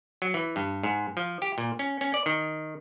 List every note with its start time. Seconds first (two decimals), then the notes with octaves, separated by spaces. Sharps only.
0.22 F#3
0.34 E3
0.56 G2
0.83 G#2
1.17 F3
1.42 G4
1.58 A#2
1.79 C#4
2.01 C#4
2.14 D5
2.26 D#3